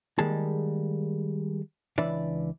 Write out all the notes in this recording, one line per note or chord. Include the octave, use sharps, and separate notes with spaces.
D#3 G3 G#3 A#3 G#4 A5
C#2 E3 D4 B4 D5 E5